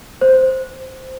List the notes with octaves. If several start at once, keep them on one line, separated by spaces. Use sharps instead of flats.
C5